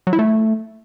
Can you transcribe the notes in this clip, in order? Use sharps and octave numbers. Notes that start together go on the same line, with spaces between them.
F#3
E4
A3